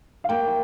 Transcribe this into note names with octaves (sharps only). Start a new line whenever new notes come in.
F5
A#3 G5
G5